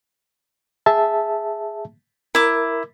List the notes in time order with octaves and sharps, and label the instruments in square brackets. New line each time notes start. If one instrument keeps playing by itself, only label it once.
[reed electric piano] G#4 E5 A5
[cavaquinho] E4 D6 [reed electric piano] A#4